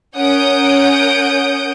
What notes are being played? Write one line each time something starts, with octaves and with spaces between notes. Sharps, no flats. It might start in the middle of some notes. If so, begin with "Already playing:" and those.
C#4 A#4 F#5 D#6 G6 D7